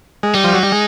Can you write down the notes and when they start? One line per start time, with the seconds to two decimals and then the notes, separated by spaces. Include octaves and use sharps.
0.23 G#3
0.34 G3 D#4
0.44 F3
0.54 F#3
0.63 G3
0.72 G#3